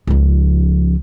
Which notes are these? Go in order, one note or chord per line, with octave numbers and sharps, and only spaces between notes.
C#2 F3